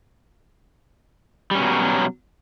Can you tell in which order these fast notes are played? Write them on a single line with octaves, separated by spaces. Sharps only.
G3 C#4 B2 F#3